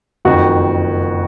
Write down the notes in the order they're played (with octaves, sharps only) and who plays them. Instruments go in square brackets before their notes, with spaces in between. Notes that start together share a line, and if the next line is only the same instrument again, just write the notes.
[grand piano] F#1 F2 D#3 F#4